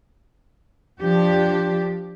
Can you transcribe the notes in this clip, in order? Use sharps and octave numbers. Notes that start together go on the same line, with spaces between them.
F3 D4 G4